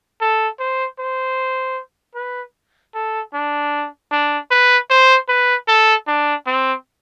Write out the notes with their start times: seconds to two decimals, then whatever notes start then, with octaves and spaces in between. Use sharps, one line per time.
0.21 A4
0.59 C5
0.99 C5
2.15 B4
2.94 A4
3.34 D4
4.11 D4
4.51 B4
4.90 C5
5.28 B4
5.68 A4
6.07 D4
6.46 C4